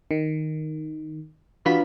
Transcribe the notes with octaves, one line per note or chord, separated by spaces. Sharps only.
D#3
E3 D4 F4 F#4 B4 B6